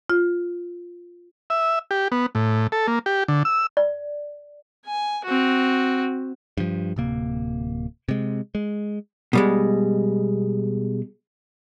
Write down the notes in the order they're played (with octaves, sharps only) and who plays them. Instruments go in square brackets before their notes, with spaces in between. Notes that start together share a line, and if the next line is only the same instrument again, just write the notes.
[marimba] F4
[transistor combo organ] E5
G4
B3
A2
A4
A#3
G4
D3
E6
[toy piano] D5
[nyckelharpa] G#5
C4 F#4
[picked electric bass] G2 F3
D1 C3 A#3
C3 G#3
G#3
[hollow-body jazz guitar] B2 G3 G#3